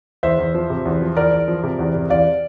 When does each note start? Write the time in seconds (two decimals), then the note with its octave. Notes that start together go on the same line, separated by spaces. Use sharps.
0.23 E2 C5 E5
0.39 E2
0.54 F3
0.70 C3
0.85 E2
1.02 F3
1.17 E2 A#4 D5
1.32 E2
1.48 F3
1.63 C3
1.79 E2
1.95 C3
2.10 E2 D5 F5